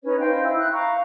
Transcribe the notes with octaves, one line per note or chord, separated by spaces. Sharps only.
C#4 D#4 B4 C#5
C5 D#5 F5 G5
E4
B5 F#6
F5 A#5 C#6